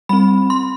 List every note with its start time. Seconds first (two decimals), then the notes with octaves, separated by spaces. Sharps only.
0.09 G3 C4 B5
0.50 C6